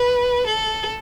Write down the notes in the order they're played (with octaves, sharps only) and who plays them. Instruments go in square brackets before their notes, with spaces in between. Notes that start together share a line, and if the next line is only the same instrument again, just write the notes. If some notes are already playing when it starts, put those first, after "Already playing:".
Already playing: [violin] B4
A4